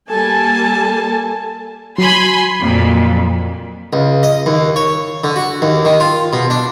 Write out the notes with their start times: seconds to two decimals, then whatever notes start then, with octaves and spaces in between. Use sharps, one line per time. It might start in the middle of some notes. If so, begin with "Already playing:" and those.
0.10 G3 A#3 A4 G#5 A5
1.98 F#3 G#5 B5 C6
2.59 F2 A#2
3.93 C#2
4.23 D#5
4.46 D#2
4.76 C#5
5.24 D3
5.36 F#4
5.62 D#2
5.85 D#3
6.00 F4
6.33 B2
6.50 D4